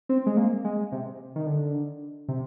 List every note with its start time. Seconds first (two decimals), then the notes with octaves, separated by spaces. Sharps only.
0.09 C4
0.26 G#3
0.37 A#3
0.64 G#3
0.92 C3
1.36 D#3
1.47 D3
2.28 C3